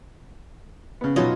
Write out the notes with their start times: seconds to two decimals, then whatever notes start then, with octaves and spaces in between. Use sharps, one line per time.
1.01 C#3 B3
1.16 B2 F#3 D#4 F4 C#5 D#5